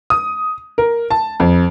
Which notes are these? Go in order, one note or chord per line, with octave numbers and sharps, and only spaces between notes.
D#6
A#4
A5
F2